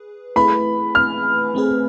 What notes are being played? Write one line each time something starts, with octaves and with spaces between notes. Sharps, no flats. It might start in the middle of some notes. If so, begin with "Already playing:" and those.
Already playing: G#4 B4
A3 E4 G#4 B4 B5
F6
A3 C4 G#4 B4